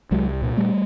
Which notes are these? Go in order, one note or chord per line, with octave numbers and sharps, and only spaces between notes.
C2 F#3 G#3
A#2
G3 A3